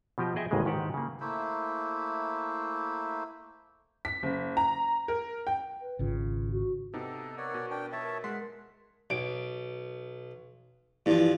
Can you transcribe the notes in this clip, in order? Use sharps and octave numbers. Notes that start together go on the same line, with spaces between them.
B2 F3 G4 D#5
G#4 D#5 E5 G5 G#5
A1 D#2 G#2 C#3 G#3 G#4
G#2 D#3 G#3 G4 F#5 A5
C#3 A#3
A3 A#3 E4 C5
B6
F#1
A#5
A#4
G5
B4
G#1 C#3 F4
F#4
C3 B3 D#4 A4 D6
A#4 B4 C#5 D5 F#5
B2 C#6
D4 B4 G5
D#4 F4 A#4 C#5 E5 A5
G#3 F#5 B5 C6 F6 A#6 B6
B1 D7
G2 E3 F3